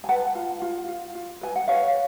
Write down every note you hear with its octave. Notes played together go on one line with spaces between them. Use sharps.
G#5
B4 F#5 A5
F4
F4
F4
F4
B4 G#5
F#5
B4 C#5 F5